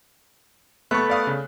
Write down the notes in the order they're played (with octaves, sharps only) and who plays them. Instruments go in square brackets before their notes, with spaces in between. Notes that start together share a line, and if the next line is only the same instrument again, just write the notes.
[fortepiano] A3 B3 [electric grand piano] C#6 F#6
[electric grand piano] D5 F5 D#6
C#3